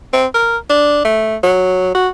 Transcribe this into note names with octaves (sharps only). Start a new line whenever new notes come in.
C4
A#4
D4
A3
F#3
F#4